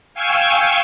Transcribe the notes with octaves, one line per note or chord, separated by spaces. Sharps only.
F5 G5 G#5 C#6 E6